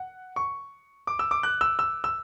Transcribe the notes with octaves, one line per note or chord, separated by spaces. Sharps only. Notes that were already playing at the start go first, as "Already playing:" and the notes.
Already playing: F#5
C#6
D6
E6
D6
F#6
E6
E6
E6